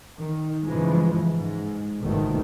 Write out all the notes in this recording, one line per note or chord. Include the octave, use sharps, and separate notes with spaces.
D#3
G2 C#3 E3 F3 G#3
G#2 G#3
G1 D2 G#2 B2 D#3 A3